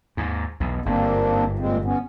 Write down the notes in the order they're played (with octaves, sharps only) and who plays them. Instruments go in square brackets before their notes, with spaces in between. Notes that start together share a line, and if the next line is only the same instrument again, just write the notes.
[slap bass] D#2 G#2
B1 E2
[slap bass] G1 G#2 [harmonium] A#3 C4 D4
[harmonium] A#2 G#3 C4
B3 C#4